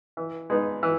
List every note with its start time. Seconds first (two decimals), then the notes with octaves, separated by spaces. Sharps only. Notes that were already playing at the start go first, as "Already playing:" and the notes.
0.17 E3
0.50 G#3 B3 D#4
0.83 E3